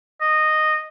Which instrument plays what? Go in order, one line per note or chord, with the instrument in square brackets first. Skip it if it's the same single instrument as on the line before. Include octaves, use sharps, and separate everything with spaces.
[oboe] D#5